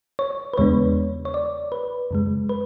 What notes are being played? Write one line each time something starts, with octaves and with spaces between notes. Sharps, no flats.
C#5
B4
E2 C#3 G#3 B3 D4 C#5
C#5
D5
B4
F#2 C#3 G#3
B4